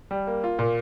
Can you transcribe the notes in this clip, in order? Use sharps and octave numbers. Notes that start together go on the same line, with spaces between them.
G3
A#3
F4
A#2